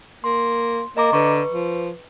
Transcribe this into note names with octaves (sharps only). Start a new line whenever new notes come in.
A#3 C6
A#3 D#5 A#5 D6
D3 B4 C#6
F3